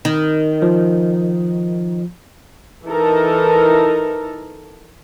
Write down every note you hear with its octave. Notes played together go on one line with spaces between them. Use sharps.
D#3
F3
E3 D#4 A4 A#4